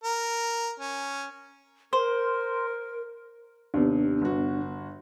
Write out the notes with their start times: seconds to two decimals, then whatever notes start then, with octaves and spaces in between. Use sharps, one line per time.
0.04 A#4
0.80 C#4
1.93 A#4 C5
3.74 D#2 C3 B3 D4
4.21 G1 F#4